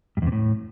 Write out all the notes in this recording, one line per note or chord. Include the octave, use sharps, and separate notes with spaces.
G2
E2
C3
A2